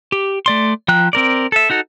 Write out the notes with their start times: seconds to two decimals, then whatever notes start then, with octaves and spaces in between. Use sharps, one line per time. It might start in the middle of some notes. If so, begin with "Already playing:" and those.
0.12 G4
0.46 A3 D5 C6
0.88 F3 G5 A#5 F#6
1.13 C4 A#4 D5
1.52 A4 E5
1.70 D#4 F#4 A4